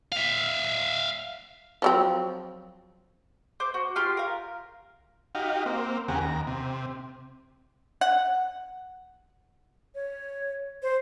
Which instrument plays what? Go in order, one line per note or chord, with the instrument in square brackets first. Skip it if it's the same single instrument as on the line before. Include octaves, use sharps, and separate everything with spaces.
[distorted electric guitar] E5 F5
[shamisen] F3 F#3 C4
[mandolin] C5 D6
F#4
F4 G4 C6 F6
A#4 F5
[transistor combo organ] D#4 F#4 G4 F5
A#3 C4
E2 C#3 G4 G#4 A#4 F#5
D#2 A#5
C3
[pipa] F#5
[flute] C#5
C5